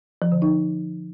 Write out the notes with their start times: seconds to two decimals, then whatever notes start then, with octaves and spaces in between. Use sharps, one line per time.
0.22 F3
0.32 D3
0.42 D#4